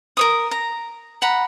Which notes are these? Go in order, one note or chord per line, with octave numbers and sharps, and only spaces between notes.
A#4 C#5 D#6
A#5
F#5 A#5 B5